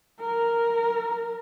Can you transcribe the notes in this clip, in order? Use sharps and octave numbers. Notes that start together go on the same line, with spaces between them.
A#4